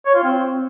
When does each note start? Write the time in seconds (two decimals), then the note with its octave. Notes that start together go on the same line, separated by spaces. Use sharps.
0.06 C#5
0.15 F4
0.23 C4